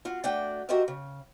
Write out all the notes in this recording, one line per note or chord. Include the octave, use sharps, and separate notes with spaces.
F4 F#4
A3 D4 F#4 D5 G5
F#4 G4 A#4 C5 D#5 E5
C#3